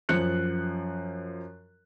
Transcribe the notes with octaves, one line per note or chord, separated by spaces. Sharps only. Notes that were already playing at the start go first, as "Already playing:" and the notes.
F#2 F3 F#6 C#7